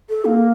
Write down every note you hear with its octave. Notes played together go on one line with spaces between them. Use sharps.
A4
A#3